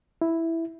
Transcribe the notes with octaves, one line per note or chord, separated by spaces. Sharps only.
E4